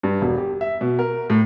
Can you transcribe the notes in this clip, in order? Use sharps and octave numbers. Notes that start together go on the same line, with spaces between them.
G2
E1
G4
E5
B2
A#4
A2